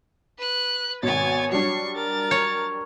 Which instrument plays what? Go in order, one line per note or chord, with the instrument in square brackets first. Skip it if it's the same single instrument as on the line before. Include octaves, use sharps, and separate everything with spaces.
[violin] B4 F#6
[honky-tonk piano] G#1 B2 [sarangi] C#5 [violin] G#5 A6
[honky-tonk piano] F#3 G3 D4 [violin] C#6 C7
[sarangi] A#4 [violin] A6
[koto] C#5